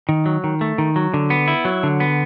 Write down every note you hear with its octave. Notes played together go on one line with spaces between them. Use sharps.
D#3
F#3
D#3
A3
D#3
F#3
D3
B3
E4
F#3
D3
B3